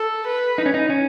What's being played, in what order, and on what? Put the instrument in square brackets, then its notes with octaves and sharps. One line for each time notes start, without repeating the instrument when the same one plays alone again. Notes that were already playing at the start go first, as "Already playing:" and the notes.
Already playing: [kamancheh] A4
B4
[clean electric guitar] D#4
C#4
D#4
C#4